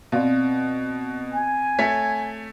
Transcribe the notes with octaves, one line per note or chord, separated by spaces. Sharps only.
B2 C4 D5 F5
G#5
A3 C#5 B6